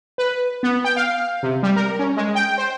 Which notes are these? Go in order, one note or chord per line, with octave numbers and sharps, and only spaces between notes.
B4
B3
G5
F5
C3
G3
A#4
C#4
G#3
G5
C5